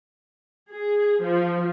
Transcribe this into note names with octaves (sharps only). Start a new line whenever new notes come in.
G#4
F3